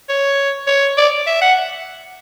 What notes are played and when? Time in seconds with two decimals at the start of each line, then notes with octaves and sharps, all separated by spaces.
0.09 C#5
0.67 C#5
0.97 D5
1.27 E5
1.42 F#5